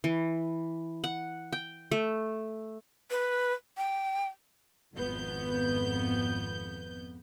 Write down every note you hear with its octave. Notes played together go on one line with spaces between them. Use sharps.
E3
F#5
G5
A3
B4
G5
G#1 F2 B3 G6